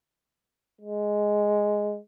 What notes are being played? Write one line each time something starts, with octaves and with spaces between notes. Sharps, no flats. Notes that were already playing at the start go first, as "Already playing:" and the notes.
G#3